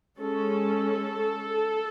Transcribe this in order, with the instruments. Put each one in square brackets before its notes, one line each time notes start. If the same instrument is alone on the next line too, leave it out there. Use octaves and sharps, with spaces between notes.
[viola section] G#3 C#4 A4